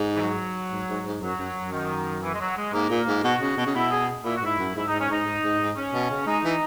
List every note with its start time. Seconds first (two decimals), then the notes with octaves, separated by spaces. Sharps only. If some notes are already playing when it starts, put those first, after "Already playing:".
Already playing: G#2
0.16 E3
0.21 F#3
0.71 G#2
0.88 G#2
1.06 G#2
1.21 F#2 F#3
1.39 F#2
1.56 F#2
1.72 D#3
2.22 E3
2.34 G#3
2.40 F#3
2.56 G#3
2.73 G#2 A#3
2.90 A#2
3.08 G#2
3.24 B2 F#4
3.41 C#3
3.58 B2
3.67 C#3
3.75 B2 E4
3.91 G#4
4.24 A#2 E4
4.36 F#4
4.42 G#2 E4
4.59 F#2
4.75 G#2 E4
4.88 G#2 D#4
5.00 C#4
5.09 G#2 D#4
5.26 G#2
5.43 G#2
5.60 G#2
5.77 C#4
5.93 B2
6.10 C#3
6.26 G#3 D#4
6.44 E3